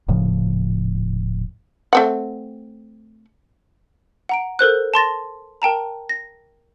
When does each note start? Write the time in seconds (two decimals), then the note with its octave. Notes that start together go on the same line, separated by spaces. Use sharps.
0.08 D#1 A2 C#3 F3
1.93 A3 C4 F#5
4.29 F#5 A#5 D7
4.59 A4 A#4 C5 F#6
4.94 A5 C6 A6 A#6
5.62 A#4 G5 A5 A#5
6.09 A#6